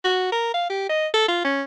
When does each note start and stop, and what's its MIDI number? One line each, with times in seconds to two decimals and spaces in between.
0.04 0.30 66
0.32 0.53 70
0.54 0.68 77
0.70 0.87 67
0.89 1.07 75
1.14 1.27 69
1.28 1.41 65
1.45 1.62 61